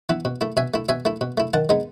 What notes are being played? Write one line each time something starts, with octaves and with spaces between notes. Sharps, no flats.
E3 B3 E4
B2
A3 E4
B2 E5 G#5
A3 E4
B2 E5 G#5
A3 E4
B2
A3 E4
D#3 F#5 A5
G#3 B3 D#4